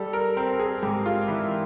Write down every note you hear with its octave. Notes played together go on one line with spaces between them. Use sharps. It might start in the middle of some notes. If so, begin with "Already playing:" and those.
Already playing: G3 A4
A#4
C4 A#4
G#4
G#2 G4
F4
E3 E4